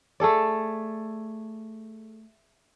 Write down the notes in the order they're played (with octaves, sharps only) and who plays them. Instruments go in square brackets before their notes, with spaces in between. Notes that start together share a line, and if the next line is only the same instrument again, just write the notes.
[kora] A3 G#4 A4 D5